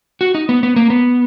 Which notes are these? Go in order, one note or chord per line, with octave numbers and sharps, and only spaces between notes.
F#4
D#4
B3
B3
A#3
B3